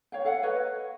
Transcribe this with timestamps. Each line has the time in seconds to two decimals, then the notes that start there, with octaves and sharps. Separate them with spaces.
0.12 C#5 F5 G5
0.25 A4 F5 F#5
0.43 B4 C#5 D#5